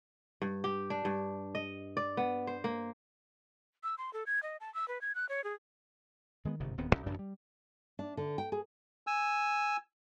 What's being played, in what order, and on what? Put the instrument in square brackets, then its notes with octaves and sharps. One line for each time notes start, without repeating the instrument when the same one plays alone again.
[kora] G2
G4
D4
G2
D#5
D5
B3
C5
A#3
[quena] E6
C6
A4
G#6
D#5
A5
E6
B4
G#6
F#6
C#5
G#4
[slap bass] D#3 G#3 A3 B3
G1 G#2 C3 D#3
D1 D#2 B3 C4
B1 C#4
A1 F#2 C#3 D4
G3
[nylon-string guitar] D4
D3
G5
G#4
[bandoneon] G#5 E6